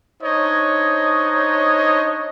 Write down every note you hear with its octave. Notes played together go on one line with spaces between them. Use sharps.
D4 D#4 C5 C#5 D#5